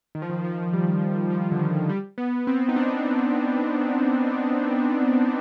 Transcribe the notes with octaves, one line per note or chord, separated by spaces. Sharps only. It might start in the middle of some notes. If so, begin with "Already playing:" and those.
D#3
F3
D#3
F3
G3
F3
D3
D#3
G3
B3
C4
D#4
D4
D#4